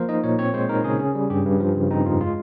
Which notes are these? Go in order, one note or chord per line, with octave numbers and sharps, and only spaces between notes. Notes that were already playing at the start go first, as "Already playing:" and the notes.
Already playing: F3 A#3 A#4 C5
D#4 D#5
A#2 C#5
C4 C#5
G#3 C5
D#4 A#4
C#3 G#4
C#4
G3
G2 G4
G2
F3
C#3
C4 D#4
F2 F4
G#3 F4